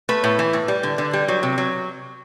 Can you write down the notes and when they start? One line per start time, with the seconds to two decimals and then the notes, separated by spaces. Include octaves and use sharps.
0.09 A3 B4
0.24 A2
0.39 E3
0.53 A2
0.68 G3
0.83 D3
0.98 D3
1.13 G3
1.28 F#3
1.43 C3
1.58 F#3